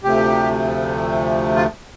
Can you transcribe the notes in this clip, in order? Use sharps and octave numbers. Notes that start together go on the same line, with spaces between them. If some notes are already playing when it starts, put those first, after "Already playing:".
D2 C3 F3 A3 G4
F4